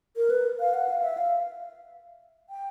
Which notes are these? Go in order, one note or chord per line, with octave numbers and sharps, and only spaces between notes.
A#4
B4
F5
F#5
F5
E5
F5
G5